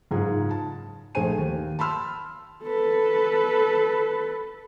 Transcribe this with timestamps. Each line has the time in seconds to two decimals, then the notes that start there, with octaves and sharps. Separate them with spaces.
0.11 F#1 G#2 F4 G#4
0.51 A5
1.15 A#1 A3 G#4 C5 G#5 D#7
1.38 D#2
1.79 A5 B5 C6 E6 F6
2.63 A4 B4